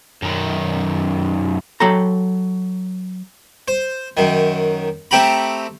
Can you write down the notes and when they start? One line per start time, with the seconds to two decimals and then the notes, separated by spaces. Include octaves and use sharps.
0.23 F#2 D#3
1.80 F#3 A4 G5 A#5
3.68 C5
4.17 F#2 D#3
5.11 A3 C4 G4 A#5 B5